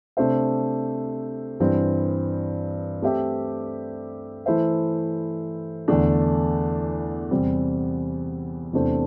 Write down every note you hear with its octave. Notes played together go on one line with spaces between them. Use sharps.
C3 A3 D4 C5 E5
G2 E3 C4
A3 C4 G4 E5
E3 A3 E4 C5 E5
E2 D3 A3 D4
E2 C3 G3 C4
E2 C3 A3 D4 C5